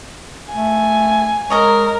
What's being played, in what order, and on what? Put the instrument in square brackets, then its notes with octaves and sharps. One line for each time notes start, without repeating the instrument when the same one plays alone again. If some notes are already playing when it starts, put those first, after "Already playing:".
[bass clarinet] A3 [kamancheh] G#5
[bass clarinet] G#3 [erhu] A#4 [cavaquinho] C#5 D#5 A#5